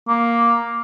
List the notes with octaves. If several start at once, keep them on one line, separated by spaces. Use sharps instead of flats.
A#3